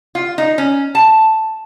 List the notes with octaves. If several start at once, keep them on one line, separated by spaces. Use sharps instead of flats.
F4
D#4
C#4
A5